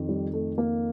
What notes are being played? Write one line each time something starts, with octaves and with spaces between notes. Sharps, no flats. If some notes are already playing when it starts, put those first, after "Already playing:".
Already playing: F2 D#3
G3
A3
A#3